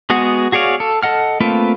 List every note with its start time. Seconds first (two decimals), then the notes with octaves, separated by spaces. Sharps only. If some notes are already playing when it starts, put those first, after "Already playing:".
0.10 G#3 B3 F#4 G#4
0.52 F#4 G#4 C#5 D5 F5
0.80 A4
1.03 A4 D#5 F#5 F6
1.40 A3 A#3 C4 F4 B4